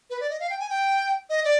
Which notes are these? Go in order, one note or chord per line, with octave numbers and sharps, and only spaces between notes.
B4
D5
D#5
F5
G5
G#5
G5
D#5
D5